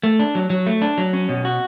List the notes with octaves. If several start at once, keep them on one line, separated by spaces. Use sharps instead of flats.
A3
D4
F#3
F#3
A3
D4
F#3
C#4
B2
F#4